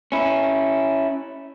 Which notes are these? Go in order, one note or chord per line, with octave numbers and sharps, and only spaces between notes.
C#4 E4